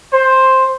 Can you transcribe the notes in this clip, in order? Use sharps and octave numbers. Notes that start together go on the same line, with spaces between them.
C5